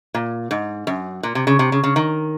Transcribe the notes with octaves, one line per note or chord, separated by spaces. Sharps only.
A#2
G#2
F#2
A#2
C3
C#3
C3
C#3
C#3
D#3